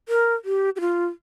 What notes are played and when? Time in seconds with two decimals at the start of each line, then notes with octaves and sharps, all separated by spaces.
0.09 A#4
0.45 G4
0.76 G4
0.81 F4